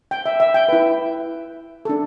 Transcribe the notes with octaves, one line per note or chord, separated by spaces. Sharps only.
G5
E5
E5
G5
E4 B4
D4 A4